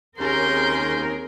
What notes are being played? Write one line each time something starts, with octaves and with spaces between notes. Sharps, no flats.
D#2 C4 C#4 G#4 A#4 C6 G6